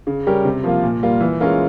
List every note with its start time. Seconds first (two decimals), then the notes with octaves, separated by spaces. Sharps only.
0.07 C#3
0.27 G3 C#4 G4 A#4
0.45 C3
0.64 F3 A#3 F4
0.83 A#2
1.03 G3 A#3 F4
1.21 E3
1.40 G#3 C#4 F4 A#4